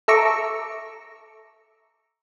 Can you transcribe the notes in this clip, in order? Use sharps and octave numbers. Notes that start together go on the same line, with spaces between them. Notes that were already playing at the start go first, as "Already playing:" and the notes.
A4 E5 A#5 C#6 D6